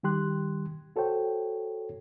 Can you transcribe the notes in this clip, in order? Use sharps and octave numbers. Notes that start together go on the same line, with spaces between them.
D#3 G3 G4 C6 F#6
F#4 A4 C5 C#5 G5